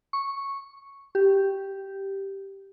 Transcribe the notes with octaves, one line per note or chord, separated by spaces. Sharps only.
C#6
G4